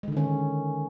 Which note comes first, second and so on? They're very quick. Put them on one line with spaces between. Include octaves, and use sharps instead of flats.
G#3 D3 D#3 C#4